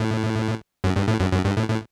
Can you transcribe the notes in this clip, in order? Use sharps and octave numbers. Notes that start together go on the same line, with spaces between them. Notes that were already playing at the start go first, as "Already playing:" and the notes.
Already playing: A2
F#2
G2
A2
F#2
F#2
G2
A2
A2